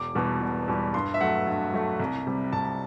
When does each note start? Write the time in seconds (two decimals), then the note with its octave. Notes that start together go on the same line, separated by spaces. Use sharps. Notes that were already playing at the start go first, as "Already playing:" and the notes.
Already playing: E1 D6
0.15 E2 B2 G3
0.41 E1
0.68 E2 B2 G3
0.94 G2 C6
1.14 E5
1.21 F#3 A3 F#5
1.47 G2
1.73 F#3 A3
2.00 C2
2.27 C3 G3
2.53 C2 A5